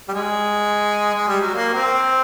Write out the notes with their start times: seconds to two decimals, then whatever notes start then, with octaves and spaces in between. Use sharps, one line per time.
0.09 G3
0.13 G#3
1.14 G#3
1.28 G3
1.41 F#3
1.54 A#3
1.74 C4